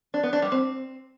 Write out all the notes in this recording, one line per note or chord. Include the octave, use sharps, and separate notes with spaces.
D4
B3
D4
G3
C4